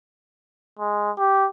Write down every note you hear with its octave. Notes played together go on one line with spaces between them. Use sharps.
G#3
G4